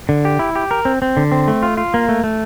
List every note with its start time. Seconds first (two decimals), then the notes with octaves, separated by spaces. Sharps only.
0.09 D3
0.25 G4
0.39 E4
0.56 G4
0.71 A#4
0.85 C4
1.02 C4
1.17 D3
1.32 C4
1.48 A3
1.63 F4
1.77 F4
1.94 A#3
2.09 A3
2.24 A3